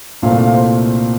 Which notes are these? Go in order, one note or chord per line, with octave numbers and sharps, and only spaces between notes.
C2 A#2 A3 C4 F5
F5
C5